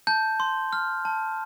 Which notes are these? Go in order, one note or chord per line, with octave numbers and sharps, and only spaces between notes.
A5 G6
C6
F6
A5